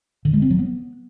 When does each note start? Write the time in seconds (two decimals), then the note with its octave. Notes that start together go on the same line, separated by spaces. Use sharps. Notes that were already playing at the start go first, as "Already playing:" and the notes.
0.25 D3
0.33 G#3
0.42 C4
0.50 F#3
0.59 B3